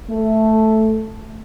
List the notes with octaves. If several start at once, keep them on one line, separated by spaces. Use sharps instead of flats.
A3